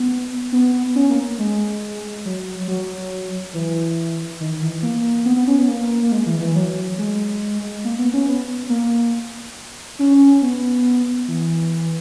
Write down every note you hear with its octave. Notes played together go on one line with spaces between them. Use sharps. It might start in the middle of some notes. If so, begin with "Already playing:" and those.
Already playing: B3
B3
C#4
A#3
G#3
F#3
F#3
E3
D#3
E3
A#3
B3
B3
C#4
B3
A#3
A#3
G#3
E3
E3
F#3
G#3
A#3
B3
C#4
B3
A#3
C#4
B3
E3